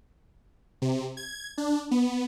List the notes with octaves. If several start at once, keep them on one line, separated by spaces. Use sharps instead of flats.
C3
G#6
D4
B3